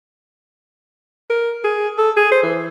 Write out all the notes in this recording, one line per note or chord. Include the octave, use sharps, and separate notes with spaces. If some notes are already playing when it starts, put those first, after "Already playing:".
A#4
G#4
A4
G#4
C5
E3